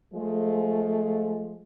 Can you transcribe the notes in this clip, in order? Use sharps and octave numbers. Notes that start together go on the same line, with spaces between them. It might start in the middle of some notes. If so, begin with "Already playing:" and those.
F3 G#3 A3